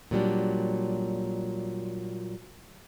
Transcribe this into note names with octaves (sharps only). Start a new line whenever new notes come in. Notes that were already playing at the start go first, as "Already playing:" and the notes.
A#2 F#3 G3 D4